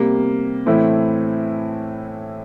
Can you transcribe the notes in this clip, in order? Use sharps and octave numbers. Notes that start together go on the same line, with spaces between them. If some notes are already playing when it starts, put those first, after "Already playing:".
Already playing: C3 G3 A#3
A2 E3 A3 C4 E4